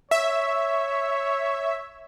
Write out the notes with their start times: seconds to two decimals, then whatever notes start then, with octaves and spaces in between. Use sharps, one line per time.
0.11 C#5 E5